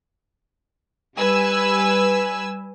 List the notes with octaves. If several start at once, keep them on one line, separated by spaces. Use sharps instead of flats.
G3 B4 G#5 E6